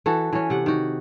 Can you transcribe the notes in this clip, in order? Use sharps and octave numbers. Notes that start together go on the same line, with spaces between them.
E3 F#4 A4
E3 C#4
C3 F#5
D#3 F#4